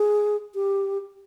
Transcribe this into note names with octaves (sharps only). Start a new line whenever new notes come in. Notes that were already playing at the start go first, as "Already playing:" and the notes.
Already playing: G#4
G4